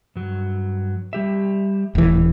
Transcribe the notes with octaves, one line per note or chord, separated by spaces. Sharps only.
G2 F#3
G3 G4 E5
D#1 A2 E3